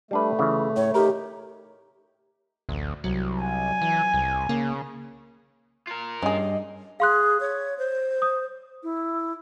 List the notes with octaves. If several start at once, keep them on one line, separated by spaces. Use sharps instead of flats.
G3 A3 D4 B4
C#3 E3 F4
A2 C#5
D#4 G4 A#4
A1 D2
C2 F#3
G#5
E3
C2
C#3 A#3
F4 A#4
G2 C#4 G#4 D#5
G#4 F5 C6 F#6
C#5
C5
D#6
E4